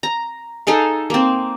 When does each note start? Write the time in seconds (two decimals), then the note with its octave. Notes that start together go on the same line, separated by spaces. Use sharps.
0.03 A#5
0.67 D#4 G#4 A4 F5
1.10 A#3 C4